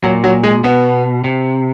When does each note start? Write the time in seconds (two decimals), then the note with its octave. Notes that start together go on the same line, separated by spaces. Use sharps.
0.03 A#2 F#3
0.24 F#3
0.43 G#3
0.64 B2 B3
1.24 C3